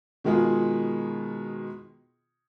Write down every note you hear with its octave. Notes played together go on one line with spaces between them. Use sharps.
B2 D#3 G#3 F4 G#4